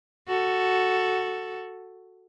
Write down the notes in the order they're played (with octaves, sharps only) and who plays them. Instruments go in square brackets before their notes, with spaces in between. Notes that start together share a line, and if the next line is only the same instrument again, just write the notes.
[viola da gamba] F#4 A4